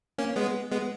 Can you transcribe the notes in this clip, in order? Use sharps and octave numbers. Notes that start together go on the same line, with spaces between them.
A#3 C#4
G#3 B3
G#3 B3